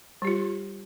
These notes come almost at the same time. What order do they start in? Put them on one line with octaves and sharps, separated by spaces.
G3 G4 F4